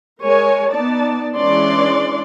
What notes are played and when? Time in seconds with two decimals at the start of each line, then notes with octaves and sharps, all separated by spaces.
0.23 G#3 A#4 C#5 G#5
0.72 B3 D#4 D5 A5
1.36 E3 G#3 C#4 D4 D5 C6